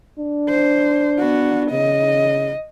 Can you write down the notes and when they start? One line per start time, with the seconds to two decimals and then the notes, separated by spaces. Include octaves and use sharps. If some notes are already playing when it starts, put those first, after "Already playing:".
0.19 D4
0.50 C5
1.20 B3 F#4
1.72 C#3 D#5